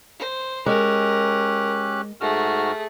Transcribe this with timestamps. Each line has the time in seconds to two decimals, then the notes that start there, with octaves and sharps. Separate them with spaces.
0.19 C5
0.66 G#3 C#4 G4 A#4 F#6
2.21 G#2 A3 F#4 G#4 F6